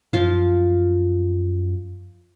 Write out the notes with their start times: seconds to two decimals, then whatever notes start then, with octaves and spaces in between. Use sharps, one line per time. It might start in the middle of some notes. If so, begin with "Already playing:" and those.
0.13 F#2 F3 F4 F5